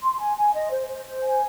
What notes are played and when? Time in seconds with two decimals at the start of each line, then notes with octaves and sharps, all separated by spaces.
0.03 C6
0.20 G#5
0.37 G#5
0.54 D#5
0.71 C5
0.89 C5
1.06 C5
1.23 G#5